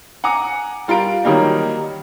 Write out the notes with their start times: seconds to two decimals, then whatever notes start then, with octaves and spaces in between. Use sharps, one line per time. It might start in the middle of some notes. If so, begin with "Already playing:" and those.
0.24 F#5 G#5 A#5 D6
0.88 G3 F4 A#4 F5 D7
1.24 D#3 F#3 G3 A#3 D#4